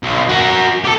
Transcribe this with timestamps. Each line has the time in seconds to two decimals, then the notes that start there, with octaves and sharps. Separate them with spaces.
0.03 B1
0.29 F#4 A#4
0.84 G4 A4